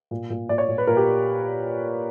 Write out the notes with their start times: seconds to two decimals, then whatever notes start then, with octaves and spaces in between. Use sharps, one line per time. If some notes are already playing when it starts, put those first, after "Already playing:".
0.11 A#2
0.30 A#2
0.49 A#2 D5
0.58 C#5
0.68 A#2
0.78 B4
0.87 A#2 A#4
0.97 G4